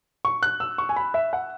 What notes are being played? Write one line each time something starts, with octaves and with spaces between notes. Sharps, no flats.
C#6
F#6
E6
C#6
G#5
B5
E5
F#5